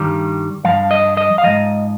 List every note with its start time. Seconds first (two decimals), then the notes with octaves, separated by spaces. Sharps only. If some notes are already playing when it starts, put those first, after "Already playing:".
Already playing: G2 D#3 G3
0.64 G2 F3 F5
0.91 D#5
1.17 D#5
1.38 F5
1.44 G#2 F3 D#5